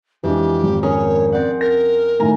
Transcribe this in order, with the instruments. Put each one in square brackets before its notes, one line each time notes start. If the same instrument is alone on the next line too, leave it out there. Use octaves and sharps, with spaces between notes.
[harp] F2 [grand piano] E3 G#3 D4 [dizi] G4
[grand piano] G#1
[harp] C#4 G#4 A#4 [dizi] C#5
[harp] C4 F#5 [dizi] D5
[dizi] A#4 [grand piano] A#6
[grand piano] A2 D#3 A3 [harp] G#5 A#5